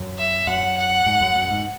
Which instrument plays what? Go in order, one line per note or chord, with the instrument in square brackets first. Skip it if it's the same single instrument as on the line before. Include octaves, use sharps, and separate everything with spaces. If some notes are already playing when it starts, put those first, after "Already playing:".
Already playing: [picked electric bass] F#2
[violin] E5
[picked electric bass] F#2 [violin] F#5
[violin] F#5
[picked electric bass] G#2
F#2
F#2
G#2